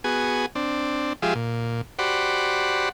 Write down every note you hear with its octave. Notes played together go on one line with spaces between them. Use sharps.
B3 F#4 G#4 G#5
C4 D4
F3 G#3 F4 G4 G#4 E5
A#2
F#4 G4 C5 D5 F#5 B5